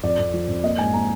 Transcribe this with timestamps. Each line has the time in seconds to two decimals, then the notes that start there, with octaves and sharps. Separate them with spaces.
0.03 F2 D5
0.18 F2
0.34 F3
0.48 F2
0.64 A#3 D#5
0.78 G#2 G#5
0.94 A#3 A#5